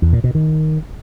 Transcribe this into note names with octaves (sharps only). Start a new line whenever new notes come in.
E2
A#2
B2
D#3